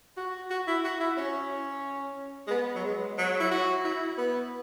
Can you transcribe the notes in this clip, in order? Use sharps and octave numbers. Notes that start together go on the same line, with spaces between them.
F#4
F#4
E4
F#4
E4
C#4
G#3
B3
F#3
G#3
F#3
E4
F#4
E4
B3